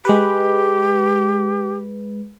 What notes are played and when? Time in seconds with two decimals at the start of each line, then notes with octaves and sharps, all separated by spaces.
0.05 G#3 G4 B4